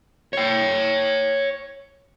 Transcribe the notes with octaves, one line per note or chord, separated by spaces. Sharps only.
C#5 G5